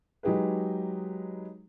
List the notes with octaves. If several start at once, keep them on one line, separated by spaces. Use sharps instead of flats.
F#3 G#3 D#4 G4 G#4 B4